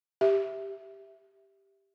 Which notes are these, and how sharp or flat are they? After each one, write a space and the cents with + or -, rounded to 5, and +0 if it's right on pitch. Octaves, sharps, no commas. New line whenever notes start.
G4 +0 E5 +0